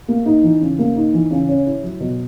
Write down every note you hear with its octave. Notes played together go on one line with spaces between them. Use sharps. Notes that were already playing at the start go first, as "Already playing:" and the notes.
A#3
D#4
E3
C#3
A#3
D#4
E3
C#3
C#4
E4
F#3
B2